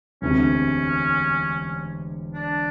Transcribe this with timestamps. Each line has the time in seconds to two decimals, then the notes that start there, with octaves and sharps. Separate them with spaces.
0.22 E1 D2 C3 C#4
2.34 D4